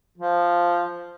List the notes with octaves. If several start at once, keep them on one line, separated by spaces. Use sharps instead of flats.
F3